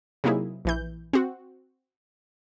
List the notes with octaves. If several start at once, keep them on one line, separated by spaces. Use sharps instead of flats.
C3 F#3 A#3 D#4 E4 G#4
A#1 E3 G6
C4 F#4